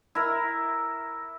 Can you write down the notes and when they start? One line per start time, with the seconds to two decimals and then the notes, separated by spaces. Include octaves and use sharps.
0.15 E4 A#4